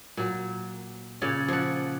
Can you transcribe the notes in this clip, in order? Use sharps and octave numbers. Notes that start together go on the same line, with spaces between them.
A#2 F#3
A#2 C#3 C#5 D5
F3 F#5